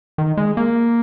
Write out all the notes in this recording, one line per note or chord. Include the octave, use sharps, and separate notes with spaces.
D#3
G#3
A#3